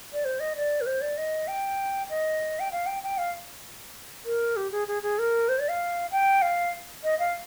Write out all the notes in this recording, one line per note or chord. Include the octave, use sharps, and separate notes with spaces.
D5
C5
D#5
D5
A#4
C5
D5
D#5
G5
D#5
G5
F5
G5
G5
F5
A#4
G4
G#4
G#4
G#4
A#4
C5
D5
F5
G5
F5
D#5
F5